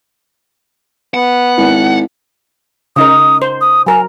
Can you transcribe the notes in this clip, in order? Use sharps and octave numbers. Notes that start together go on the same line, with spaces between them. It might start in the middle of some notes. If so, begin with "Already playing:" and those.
B3 F#5
G#1 E4
C#3 D#4 A#4 D#6
C5
D#6
F#3 A#4 G#5